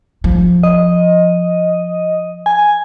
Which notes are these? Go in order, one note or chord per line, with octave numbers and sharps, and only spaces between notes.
F3
D#5
G#5